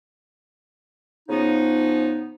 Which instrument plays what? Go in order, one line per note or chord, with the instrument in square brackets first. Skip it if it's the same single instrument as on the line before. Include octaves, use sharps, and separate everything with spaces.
[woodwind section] C#3 F3 B3 D#4